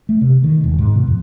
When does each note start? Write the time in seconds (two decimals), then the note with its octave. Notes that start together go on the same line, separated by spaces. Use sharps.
0.09 A3
0.21 C3
0.44 D#3
0.64 E1
0.79 G#2
0.95 B2
1.07 F2